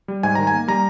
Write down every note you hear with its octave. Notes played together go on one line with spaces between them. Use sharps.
G3
G#2 G#5
D#3 A#5
G#5
A#3
G3 A#5